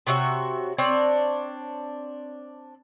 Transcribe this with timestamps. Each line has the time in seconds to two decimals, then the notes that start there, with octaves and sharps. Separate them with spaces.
0.07 C3 F#4 C#5 E5
0.78 C4 D4 C#5